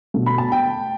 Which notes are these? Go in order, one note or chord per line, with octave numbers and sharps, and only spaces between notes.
B2 A3
B5
A5
G5